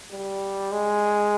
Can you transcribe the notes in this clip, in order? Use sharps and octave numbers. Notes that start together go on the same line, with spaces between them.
G3
G#3